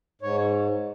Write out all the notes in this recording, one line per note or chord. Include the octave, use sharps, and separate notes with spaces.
G#2 C#5